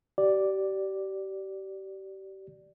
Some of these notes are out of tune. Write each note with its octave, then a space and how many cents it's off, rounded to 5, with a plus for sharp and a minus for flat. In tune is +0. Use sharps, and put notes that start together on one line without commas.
G4 -30 D5 +0